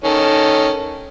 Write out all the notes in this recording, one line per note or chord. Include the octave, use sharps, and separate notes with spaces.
D#3 C#4 A4